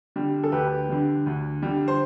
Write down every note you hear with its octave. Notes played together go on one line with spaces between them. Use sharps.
D3 G3
A4
D2 G4 B4
D3 G3
D2
D3 G3
C5